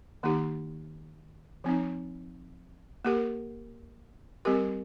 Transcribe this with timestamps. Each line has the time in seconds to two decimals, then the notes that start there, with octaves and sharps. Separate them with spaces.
0.23 D#3 A#3 D#4 G4
1.64 F3 C4 D#4
3.05 A#3 G4 A#4
4.45 G3 C4 G4 A#4